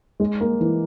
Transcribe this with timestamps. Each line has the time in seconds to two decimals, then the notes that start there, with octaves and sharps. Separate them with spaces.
0.20 G#3
0.41 A#3
0.61 E3